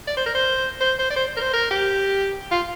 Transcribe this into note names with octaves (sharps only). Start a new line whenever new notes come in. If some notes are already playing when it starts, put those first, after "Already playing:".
D5
C5
A#4
C5
C5
C5
D5
C5
A#4
C5
A#4
G4
F4